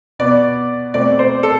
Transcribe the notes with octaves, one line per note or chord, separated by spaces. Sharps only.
B2 B3 D5
B2 A3 C4 D5
C5
A4